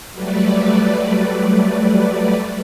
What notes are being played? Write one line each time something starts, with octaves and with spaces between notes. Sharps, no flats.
F#3 G3 A3 B4 D5